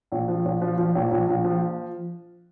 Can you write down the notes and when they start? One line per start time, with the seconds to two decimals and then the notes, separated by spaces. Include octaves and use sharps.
0.12 A#1
0.28 F3
0.45 A#1
0.62 F3
0.78 F3
0.95 A#1
1.11 A#1
1.28 A#1
1.44 F3